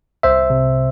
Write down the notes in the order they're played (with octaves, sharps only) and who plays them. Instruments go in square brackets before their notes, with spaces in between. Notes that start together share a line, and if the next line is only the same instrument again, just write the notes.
[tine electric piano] C2 C5 E5
C3